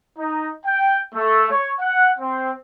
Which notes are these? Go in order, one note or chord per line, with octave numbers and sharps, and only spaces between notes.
D#4
G5
A3
C#5
F#5
C4